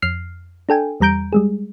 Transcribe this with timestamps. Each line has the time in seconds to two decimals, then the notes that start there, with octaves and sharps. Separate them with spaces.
0.02 F2 F6 C7
0.69 D4 A4 G5 G#5
1.00 E2 G3 A#5 G6 D7
1.33 G3 G#3 G#4